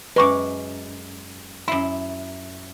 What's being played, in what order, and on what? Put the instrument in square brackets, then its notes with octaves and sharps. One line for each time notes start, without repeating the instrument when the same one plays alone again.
[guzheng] F#2 G#3 [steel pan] B4 C#6 D6
[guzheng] F#2 E4 [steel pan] C6